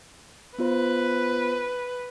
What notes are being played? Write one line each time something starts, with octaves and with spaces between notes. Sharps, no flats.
B3 F4 B4 C5